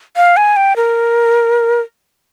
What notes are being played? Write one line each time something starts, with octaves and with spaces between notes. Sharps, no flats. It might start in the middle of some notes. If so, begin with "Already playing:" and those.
F5
G#5
G5
A#4